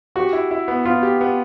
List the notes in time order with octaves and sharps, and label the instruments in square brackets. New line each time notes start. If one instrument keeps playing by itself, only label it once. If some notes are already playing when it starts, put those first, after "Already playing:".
[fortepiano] F#4 [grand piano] G4
[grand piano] E4
E4
B3
[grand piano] B3 [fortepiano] F4
[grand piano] G4
B3